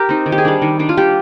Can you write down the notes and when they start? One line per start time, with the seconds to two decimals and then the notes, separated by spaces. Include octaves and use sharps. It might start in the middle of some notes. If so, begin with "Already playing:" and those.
Already playing: G4 A#4
0.09 C4 D#4
0.26 D#3
0.32 G4
0.38 G#4
0.45 G3 D4
0.62 D#3
0.79 G3 D4
0.89 F4
0.97 G3 G4